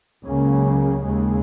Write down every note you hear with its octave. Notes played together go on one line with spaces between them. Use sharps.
C#2 C#3 F#3 A#3 C#4
D#2 C#3 G#3